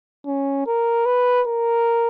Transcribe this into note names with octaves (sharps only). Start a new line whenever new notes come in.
C#4
A#4
B4
A#4